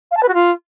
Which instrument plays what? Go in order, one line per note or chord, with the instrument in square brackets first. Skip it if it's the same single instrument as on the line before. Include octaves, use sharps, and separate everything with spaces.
[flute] F5
A5
B4
F#4
F4